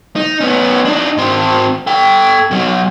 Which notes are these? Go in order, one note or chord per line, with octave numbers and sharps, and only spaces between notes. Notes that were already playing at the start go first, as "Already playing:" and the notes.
D#4
B3 C#4
D4 D#4
G#2 C4
A4 G5
B2 F#3